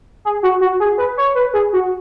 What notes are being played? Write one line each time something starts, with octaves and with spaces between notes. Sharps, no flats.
G#4
F#4
F#4
G#4
B4
C#5
B4
G#4
F#4